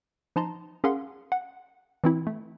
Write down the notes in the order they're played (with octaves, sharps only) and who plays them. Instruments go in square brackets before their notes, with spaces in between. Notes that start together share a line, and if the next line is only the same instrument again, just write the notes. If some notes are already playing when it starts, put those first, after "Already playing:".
[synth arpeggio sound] F3 D#4 A5 A#5 C6
C#4 G#4 A#4 F5 F#5 C6
F#5
E3 C4 E4
A3